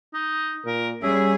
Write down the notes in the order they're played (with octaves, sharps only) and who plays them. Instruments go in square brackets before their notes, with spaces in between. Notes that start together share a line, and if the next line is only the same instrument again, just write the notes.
[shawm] D#4
[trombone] A#2 [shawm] A#4
[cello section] G3 G#4 [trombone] C#4 [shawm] E5